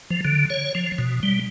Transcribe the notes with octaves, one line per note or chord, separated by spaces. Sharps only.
F3
D3
C#5
F3
B2
G3